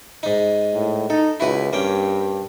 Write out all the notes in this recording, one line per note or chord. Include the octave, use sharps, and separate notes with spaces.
G#2 D#4
A2
D#4 A4
C#2 E4 F#4 B4
G2 A#3 C#4 G5